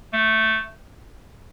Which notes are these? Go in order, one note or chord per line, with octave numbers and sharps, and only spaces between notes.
A3